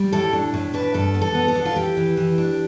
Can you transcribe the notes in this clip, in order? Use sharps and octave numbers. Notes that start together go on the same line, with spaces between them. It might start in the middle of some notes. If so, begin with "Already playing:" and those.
Already playing: G3
A2 A4
D4
A2
D4 B4
G2 A4
B3
A4
B3
A4
D4
F4
E3 G4
E3
E3
D4